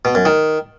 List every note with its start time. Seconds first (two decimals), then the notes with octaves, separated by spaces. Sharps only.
0.05 B2
0.15 F#2
0.25 D#3